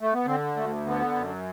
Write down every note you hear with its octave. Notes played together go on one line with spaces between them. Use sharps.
A3
B3
D3 C4
D2 A3
D3 B3
F#2